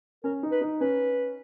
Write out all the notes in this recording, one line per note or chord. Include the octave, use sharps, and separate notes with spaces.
C#4 A#4
D#4
B4
D#4
C#4 B4